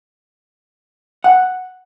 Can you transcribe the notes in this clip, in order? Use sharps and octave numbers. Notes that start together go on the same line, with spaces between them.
F#5